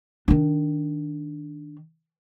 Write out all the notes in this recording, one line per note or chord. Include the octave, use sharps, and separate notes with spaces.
D#3 D4